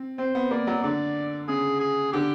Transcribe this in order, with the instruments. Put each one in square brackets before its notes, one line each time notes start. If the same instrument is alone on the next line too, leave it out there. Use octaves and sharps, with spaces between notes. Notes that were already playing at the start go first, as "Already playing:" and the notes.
Already playing: [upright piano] C4
[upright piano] C4 [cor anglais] C5
[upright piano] B3
[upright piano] A#3 [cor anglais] D5
[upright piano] F#3
[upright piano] D3 [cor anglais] D5
[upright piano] C#3 [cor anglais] G#4
[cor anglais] G#4
[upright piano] D3 [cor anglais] G4